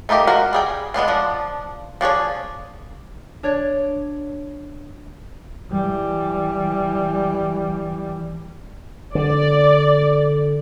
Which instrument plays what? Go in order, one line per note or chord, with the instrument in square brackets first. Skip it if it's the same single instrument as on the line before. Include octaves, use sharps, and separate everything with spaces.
[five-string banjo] A3 D#4 F4 G4 A#4
G#3 F#4 A#4 F5
G3 G#4 G5
G#3 B3 D4 F4
F3 D4
F3 D4 G#4 C#5
[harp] D4 C#5 D5
[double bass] E3 G3
[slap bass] D3 [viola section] D5